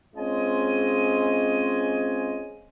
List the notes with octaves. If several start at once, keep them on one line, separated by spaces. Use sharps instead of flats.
G#3 C4 C#4 F4 D#5 G#5